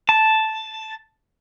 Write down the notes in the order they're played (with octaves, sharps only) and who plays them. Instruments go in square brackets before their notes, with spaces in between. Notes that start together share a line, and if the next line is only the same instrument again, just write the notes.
[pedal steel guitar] A5